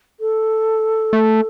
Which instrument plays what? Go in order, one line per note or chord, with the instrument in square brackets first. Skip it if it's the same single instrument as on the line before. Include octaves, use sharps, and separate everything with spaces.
[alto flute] A4
[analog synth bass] A3